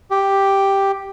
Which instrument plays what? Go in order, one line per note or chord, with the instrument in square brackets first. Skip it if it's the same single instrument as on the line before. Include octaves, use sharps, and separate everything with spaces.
[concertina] G4